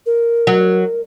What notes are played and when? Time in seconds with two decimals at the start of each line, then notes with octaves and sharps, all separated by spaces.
0.06 A#4
0.47 F#3